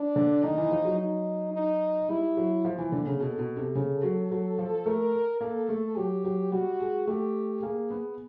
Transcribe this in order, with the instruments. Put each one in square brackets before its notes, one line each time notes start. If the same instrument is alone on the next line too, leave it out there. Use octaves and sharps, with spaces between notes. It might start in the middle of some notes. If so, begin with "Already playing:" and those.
Already playing: [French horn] D4
[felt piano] D3
[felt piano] D#3 [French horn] D#4
[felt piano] E3
F3
F#3
[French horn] D#4
D#4
[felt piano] G3 [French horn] E4
[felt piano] F#3
F3
E3
D3
C#3
[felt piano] B2 [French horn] A4
[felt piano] B2
C3
C#3
F#3
F#3
F3
[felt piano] A3 [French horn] A#4
[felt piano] A#3 [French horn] A4
[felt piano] A3
[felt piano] F#3 [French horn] G4
[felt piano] F#3
[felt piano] G3 [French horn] F#4
[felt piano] G#3
[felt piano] A3 [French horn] G4
[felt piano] A#3 [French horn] G#4
[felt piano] B3